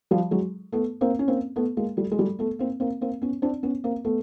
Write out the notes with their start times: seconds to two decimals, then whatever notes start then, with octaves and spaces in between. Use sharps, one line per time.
0.11 F3 G3
0.31 F#3 G#3
0.72 A3 B3
1.01 A#3 C4
1.19 C#4
1.28 A#3 C4
1.56 A3 B3
1.77 G#3 A#3
1.97 G3 A3
2.12 G#3
2.19 G3 A3
2.39 A3 B3
2.59 A#3 C4
2.80 A#3 C4
3.01 A#3 C4
3.22 B3 C#4
3.42 C4 D4
3.63 B3 C#4
3.84 A#3 C4
4.04 A3 B3